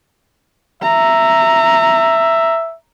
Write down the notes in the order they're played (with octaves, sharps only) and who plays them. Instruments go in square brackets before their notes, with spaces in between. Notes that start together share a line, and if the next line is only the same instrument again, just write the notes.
[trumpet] E5 [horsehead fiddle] A#5